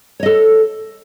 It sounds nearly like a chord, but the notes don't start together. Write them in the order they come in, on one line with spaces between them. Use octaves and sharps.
C#5 D#5 A4